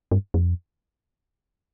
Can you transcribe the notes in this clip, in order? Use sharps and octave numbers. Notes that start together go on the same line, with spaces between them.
G2
F2